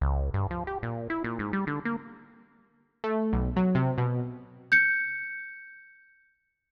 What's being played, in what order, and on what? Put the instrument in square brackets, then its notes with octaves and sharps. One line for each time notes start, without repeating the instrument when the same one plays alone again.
[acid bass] C#2
G2
F3
G4
A#2
E4
A#2
G#2
G3
D3
A#3
[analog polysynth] A3
B1
F#3
C3
B2
[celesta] G6 C#7